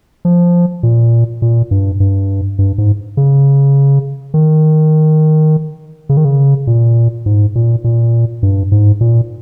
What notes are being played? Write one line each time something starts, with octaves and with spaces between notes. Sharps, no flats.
F3
A#2
A#2
G2
G2
G2
G#2
C#3
D#3
C#3
D#3
C#3
A#2
G#2
A#2
A#2
G2
G#2
A#2